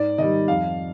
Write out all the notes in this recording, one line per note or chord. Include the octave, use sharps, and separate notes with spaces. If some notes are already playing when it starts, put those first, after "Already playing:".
Already playing: G#2 D5
D#3 G3 D#5
F2 F5